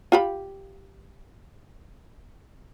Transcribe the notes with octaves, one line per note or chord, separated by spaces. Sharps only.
F4 G4 B5